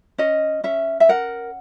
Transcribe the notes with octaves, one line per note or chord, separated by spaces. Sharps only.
C#4 D#5
C#4 E5
E5
A#4 F#5